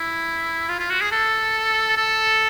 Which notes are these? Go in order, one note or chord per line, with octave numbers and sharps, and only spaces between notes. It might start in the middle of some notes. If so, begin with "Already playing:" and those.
Already playing: E4
F4
F4
F#4
G#4
A4
A4